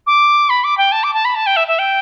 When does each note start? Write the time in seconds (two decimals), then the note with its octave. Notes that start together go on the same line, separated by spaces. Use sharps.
0.07 D6
0.50 B5
0.64 D6
0.78 G5
0.92 A5
1.04 D6
1.14 A5
1.25 B5
1.35 A5
1.46 G5
1.56 E5
1.68 E5
1.79 G5